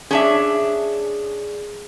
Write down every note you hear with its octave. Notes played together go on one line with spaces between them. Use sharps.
C#4 D4 G#4 E5